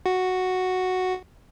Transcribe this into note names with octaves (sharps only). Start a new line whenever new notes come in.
F#4